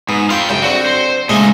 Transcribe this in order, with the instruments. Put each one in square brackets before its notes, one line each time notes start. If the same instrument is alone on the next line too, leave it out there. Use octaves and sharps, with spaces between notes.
[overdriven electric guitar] G#2 [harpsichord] B3
[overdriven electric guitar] F4 G5 [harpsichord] F5
[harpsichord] F#2 C#3 [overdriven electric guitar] G5
[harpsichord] D3 C4 [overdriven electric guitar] F#4
[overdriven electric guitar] C5
[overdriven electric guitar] A#2 C#3 [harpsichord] G#3 A3 D#4